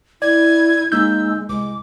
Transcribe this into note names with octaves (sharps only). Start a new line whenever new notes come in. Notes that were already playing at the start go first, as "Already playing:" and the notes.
E4 D5 G#6
G#3 A#3 D#4 E6 G6
C2 G#3 D6